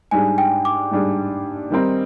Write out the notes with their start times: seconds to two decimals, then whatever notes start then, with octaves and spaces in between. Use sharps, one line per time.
0.11 G#2 G3 D4 G#4 G#5
0.38 G5
0.65 D6
0.91 G#2 G3 D4 G#4
1.71 D#3 G3 C4 D#4 A#4